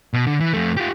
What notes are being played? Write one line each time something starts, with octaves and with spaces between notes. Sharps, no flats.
B2
D3
E3
F2 A3
F4 G4